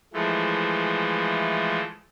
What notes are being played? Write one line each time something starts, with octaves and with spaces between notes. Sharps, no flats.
E3 F3 G#3 A3